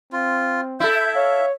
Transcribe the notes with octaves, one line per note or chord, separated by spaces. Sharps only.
C4 F4
E4 A4 E5 G6
C#5 F5